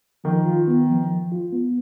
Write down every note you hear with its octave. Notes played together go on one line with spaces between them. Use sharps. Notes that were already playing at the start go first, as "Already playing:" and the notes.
D#3 F3
F4
B3
F3
F3
F4
B3